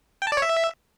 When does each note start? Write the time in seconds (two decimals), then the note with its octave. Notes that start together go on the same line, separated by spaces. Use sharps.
0.22 G5
0.27 A5
0.32 D5
0.37 C#5
0.42 E5